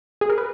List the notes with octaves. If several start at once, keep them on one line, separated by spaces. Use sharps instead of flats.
G#4
A#4
B4